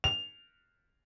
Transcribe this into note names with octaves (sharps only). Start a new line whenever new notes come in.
F7